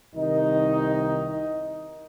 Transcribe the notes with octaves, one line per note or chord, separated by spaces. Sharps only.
C2 D#3 D#4